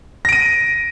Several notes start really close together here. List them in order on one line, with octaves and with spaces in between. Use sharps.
A#6 D7 D#7